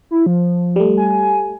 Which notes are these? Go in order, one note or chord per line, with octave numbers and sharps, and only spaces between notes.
E4
F3
G3 A3
G#5